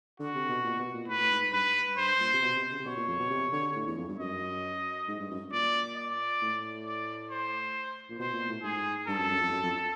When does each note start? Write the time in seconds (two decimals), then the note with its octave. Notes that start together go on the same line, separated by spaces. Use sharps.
0.20 D3 F#4
0.35 C3
0.49 B2
0.64 A#2
0.79 B2
0.93 A#2
1.08 A2 B4
1.20 A2
1.31 G#2
1.52 G2 B4
1.97 G2 C5
2.20 A#2
2.33 C3
2.42 B2
2.56 C3
2.72 C#3
2.79 C3
2.86 B2 C#5
2.97 A#2
3.08 F2
3.20 B2
3.30 C3
3.52 D3
3.75 A2
3.87 E2
3.97 F2
4.09 G2
4.19 F#2 D#5
5.08 G#2
5.20 G2
5.31 F#2
5.52 A#2 D5
5.96 D5
6.42 A2
6.86 D5
7.31 C5
8.10 A#2
8.19 B2 C5
8.33 A#2
8.48 A2
8.63 G#2 G#4
9.07 G2 A4
9.19 F#2
9.30 F#2
9.41 F2
9.52 F#2
9.63 F2